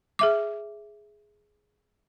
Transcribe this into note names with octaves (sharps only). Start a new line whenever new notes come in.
G#4 E5 D6